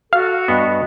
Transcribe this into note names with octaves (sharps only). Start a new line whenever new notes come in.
F#4 A4 F5
G2 B3 D#5